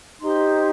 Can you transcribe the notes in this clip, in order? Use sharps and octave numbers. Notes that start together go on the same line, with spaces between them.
D#4 G4 C5 C6